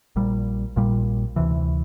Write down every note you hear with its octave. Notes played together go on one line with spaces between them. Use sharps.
A#1 A#2 G3
A#1 A#2 G3
D2 C3 E3